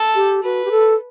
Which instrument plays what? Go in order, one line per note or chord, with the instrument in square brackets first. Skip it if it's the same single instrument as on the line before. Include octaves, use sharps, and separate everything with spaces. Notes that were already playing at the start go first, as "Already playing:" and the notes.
Already playing: [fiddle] A4
[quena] G4
[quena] F#4 [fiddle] B4
[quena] G4
A4